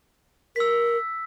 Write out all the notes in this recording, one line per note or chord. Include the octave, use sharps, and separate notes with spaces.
A#4 E6 B6